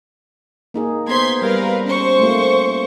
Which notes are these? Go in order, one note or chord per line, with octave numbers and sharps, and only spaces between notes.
A#3 D#4 G#4
B3 C5 C6 G#6 B6
G3 A#4 B4 F5
C#4 C5 C#6
A3 A#3 F4